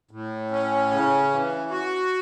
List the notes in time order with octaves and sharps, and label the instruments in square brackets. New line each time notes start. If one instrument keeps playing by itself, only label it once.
[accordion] A2
C#4
C#3
E3
F#4